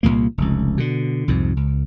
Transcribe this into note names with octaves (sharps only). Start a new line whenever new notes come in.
C2 F2 A#2 A#3
F1 C#2
B2 D3
C2 F2 G#2
C#2